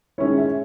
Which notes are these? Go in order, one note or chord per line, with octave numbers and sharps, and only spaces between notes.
D#3 G#3 C#4 E4 C#5
E5